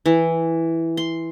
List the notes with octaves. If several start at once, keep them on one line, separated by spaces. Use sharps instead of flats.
E3
C6